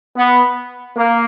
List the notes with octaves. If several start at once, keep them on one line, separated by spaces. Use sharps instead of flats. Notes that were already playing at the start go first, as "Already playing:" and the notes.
B3
A#3